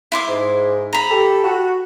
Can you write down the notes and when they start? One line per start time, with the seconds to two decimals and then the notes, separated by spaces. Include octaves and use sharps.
0.12 E4 C6 D6
0.28 G#2
0.93 A#5 B5
1.11 G4 A4
1.44 F#4